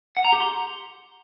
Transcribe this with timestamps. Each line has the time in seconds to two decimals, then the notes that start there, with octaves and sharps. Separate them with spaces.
0.17 F#5
0.25 A#5
0.32 G4
0.40 C6